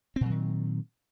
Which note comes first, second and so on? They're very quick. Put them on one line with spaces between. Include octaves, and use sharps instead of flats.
C4 A#2 F#3 D#3